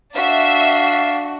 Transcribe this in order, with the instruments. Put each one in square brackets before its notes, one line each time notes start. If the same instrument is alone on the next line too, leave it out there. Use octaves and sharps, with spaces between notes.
[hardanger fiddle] D4 [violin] F#4 [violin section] E5 [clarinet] F5